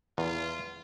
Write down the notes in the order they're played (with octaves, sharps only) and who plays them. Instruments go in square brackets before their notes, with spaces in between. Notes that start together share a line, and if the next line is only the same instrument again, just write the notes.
[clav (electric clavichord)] E2 [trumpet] F4